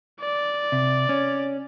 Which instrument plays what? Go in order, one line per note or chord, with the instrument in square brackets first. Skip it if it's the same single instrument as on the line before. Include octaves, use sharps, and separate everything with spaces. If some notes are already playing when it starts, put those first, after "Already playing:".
[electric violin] D5
[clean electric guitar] C3
C#4